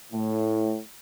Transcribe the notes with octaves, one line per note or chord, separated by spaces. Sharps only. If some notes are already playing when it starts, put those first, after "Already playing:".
A2